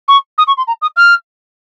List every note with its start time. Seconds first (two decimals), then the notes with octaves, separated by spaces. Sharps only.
0.08 C#6
0.38 D#6
0.47 C#6
0.57 C6
0.67 A#5
0.82 D#6
0.96 F6